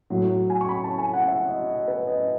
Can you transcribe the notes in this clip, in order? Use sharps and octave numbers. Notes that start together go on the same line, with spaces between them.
A2 F#3
G#5
C#6
B5
A5
G#5
F#5
E5
D#5
D#5
B4
D#5